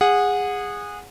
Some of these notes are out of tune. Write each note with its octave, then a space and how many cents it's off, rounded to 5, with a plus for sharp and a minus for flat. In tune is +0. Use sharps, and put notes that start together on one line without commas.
G#4 -20 F#5 -20